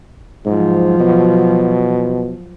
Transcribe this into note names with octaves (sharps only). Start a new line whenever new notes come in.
G#2 F3 F#3
B2